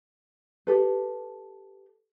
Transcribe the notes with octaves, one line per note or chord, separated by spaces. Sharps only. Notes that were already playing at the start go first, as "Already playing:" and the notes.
G4 A4 B4